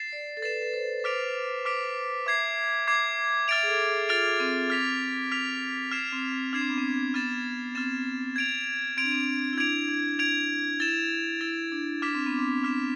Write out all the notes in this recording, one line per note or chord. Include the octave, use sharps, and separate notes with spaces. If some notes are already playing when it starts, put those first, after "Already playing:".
Already playing: A6 C7 E7
D5
A4
B4 A6 C7 E7
B4
C5
B4
C5 D6 F6 B6 D7 F7
D6 F6 B6 D7 F7
E5 D6 G#6 C7
D6 G#6 C7
E5 F6 A6 D7 F7
G#4
A4
G#4
F4 F6 A6 D7 F7
C4
F6 B6 F7
F6 B6 F7
F6 G#6 C7 E7
C4
C4
D4 F6 G#6 C7 E7
C4
B3
C4
B3 F6 A6 E7
C4 F6 A6 E7
G#6 D7 F7
C4 G#6 D7 F7
D4
C4
E4
D4 G#6 D7 F7
D4
G#6 D7 F7
E4 A6 E7
E4 A6 E7
D4
D4 D6 F6 B6 E7
C4
B3
C4
D4 D6 F6 B6 E7